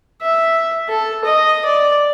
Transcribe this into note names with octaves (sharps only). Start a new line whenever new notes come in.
E5
A4
D#5
D5